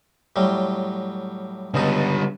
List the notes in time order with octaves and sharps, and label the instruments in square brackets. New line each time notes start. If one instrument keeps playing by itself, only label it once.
[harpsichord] A2 F#3 G3
[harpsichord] C#2 B2 D#4 [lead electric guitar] D3 G3